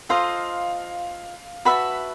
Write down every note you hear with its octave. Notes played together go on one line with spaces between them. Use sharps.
F4 A4 C5 D#5 F5
F#4 B4 E5 A5 B5